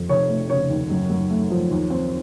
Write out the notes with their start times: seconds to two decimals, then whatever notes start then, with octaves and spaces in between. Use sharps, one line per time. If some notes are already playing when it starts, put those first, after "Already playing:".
Already playing: F2
0.09 F1 C#5
0.29 A3
0.50 C#3 C#5
0.69 D#2
0.90 F#2
1.10 F#2
1.30 A3
1.50 F3
1.71 D#2
1.90 C4